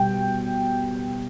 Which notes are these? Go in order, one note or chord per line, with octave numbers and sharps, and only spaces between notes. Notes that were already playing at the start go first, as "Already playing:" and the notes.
Already playing: B2 G3 G5